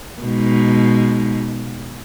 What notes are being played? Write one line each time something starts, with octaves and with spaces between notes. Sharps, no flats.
B2 G#3 D#4